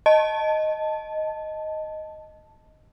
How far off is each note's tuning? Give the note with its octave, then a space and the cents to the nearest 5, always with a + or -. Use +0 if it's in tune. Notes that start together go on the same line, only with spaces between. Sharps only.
D#5 +0 A5 +0